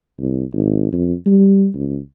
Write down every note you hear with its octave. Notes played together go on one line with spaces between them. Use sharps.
C2
G#1
F2
G3
C#2